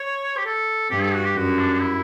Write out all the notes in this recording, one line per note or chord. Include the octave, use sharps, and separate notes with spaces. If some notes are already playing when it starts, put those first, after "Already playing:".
Already playing: C#5
G4
A4
G2 G4
A4
F#4
G4
F#2 F#4
D4
D4
E4